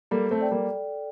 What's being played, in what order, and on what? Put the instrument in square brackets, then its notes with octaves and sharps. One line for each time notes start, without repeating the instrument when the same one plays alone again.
[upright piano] G3 A#3 [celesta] A4
[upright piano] A3 C4
[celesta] D5 G5
[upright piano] G3 A#3